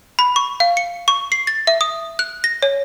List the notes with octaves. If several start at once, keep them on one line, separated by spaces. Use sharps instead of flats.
B5
C#6
F5
C#7
C#6
C7
A6
E5
D#6
F#6
A#6
C#5